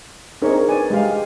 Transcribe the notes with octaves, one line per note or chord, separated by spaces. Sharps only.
C4 D4 D#4 G#4 A#4 C#5
B4 D5 G#5
G#3 G4 F5